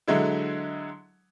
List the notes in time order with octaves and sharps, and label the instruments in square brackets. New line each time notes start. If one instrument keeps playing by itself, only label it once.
[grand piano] D3 F#3 G#3 E4